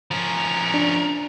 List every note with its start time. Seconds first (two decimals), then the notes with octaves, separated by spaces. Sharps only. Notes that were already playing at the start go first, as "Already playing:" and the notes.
0.11 F3 C#4 A#4
0.74 D4